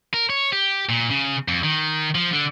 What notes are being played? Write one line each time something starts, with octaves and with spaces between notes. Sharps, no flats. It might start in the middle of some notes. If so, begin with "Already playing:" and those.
A#4
C#5
G4
A#2
C#3
F2
D#3
F3
D3